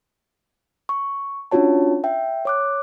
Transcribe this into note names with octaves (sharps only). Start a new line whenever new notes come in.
C#6
C#4 D4 F4 F#4 C#5 A5
E5 G5
C#5 D6 F#6